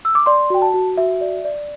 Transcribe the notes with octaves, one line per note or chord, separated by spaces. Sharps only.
E6
D6
D5 C6
F#4 G5
A5
F#4
F#4 E5
D5
D5